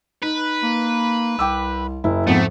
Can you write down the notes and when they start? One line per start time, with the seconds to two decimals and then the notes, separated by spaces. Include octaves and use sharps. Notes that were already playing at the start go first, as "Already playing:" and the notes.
0.22 D#4 B4
0.63 A#3
1.39 C2 G5 D6 E6
2.04 F#1 E4
2.27 F2 G#2 F3 A3 B3